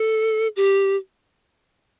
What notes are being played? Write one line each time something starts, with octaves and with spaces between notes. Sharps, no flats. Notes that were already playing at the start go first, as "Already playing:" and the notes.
Already playing: A4
G4